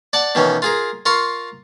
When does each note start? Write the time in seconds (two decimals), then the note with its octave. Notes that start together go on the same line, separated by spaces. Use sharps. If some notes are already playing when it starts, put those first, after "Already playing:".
0.13 D5 F#5 A5
0.35 B2 D#3 E3 C#4
0.62 F4 G#4 A#4
1.06 F4 A#4 C6 C#6